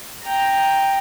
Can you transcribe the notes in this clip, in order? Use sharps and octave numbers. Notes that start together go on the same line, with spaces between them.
G5 A#5